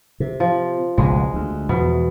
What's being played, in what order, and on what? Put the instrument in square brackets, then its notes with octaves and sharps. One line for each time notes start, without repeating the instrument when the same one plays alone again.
[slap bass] C3
[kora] F3
[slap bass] F1 C#2 B2 [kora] G#3
[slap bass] D2
[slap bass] E2 F3 [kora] B2